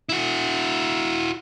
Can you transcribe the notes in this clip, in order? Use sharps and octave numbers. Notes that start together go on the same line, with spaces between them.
E4 F#4